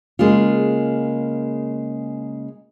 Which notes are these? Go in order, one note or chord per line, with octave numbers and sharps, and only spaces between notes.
C#3 G#3 A#3 F4